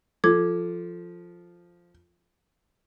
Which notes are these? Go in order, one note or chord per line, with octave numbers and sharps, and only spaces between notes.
F3 A4 D6 G#6